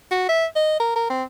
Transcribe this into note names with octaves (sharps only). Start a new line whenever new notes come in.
F#4
E5
D#5
A#4
A#4
C4